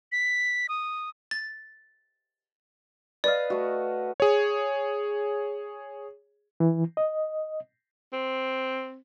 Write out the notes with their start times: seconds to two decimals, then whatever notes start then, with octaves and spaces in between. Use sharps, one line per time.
0.12 B6
0.69 D#6
1.31 A6
3.24 B4 D5 D#5 F5
3.50 A3 F#4
4.20 G#4 C#5
6.60 E3
6.97 D#5
8.13 C4